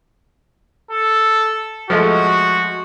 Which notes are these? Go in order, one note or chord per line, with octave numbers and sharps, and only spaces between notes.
A4
F3 G#3 A3 F#4